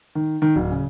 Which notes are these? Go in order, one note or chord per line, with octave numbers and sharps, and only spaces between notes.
D#3
D#3
D1
C#3